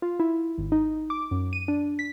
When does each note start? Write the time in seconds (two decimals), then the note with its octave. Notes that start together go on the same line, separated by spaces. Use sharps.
0.02 F4
0.20 E4
0.58 G#1
0.72 D#4
1.10 D6
1.31 F#2
1.53 D#7
1.68 D4
1.99 B6